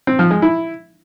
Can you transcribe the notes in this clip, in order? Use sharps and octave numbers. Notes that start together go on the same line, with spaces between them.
C4
F3
G#3
E4